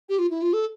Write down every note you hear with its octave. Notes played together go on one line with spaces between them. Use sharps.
G4
F4
E4
F4
A4